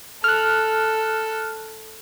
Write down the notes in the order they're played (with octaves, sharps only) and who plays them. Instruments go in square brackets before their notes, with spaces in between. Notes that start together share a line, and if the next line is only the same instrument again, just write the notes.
[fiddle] A4 [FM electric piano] F6 F#6